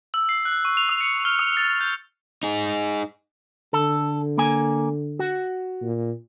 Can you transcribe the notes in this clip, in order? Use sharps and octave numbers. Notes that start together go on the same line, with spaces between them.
E6
C7
F#6
C#6
F7
D#6
C#7
F6
D#6
A6
G6
D#4 G#4
D3 A4
A#3 G#5
F#4
A#2